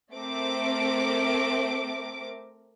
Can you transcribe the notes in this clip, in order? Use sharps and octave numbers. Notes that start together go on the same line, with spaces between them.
A3 C4 A#4 D6